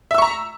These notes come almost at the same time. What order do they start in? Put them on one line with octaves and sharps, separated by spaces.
E5 E6 C#6 A#5